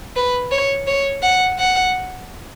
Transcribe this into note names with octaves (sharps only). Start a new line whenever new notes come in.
B4
C#5
C#5
F#5
F#5